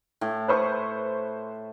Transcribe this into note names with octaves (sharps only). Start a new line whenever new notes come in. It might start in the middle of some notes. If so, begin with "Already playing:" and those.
A2
B4 C5 C#6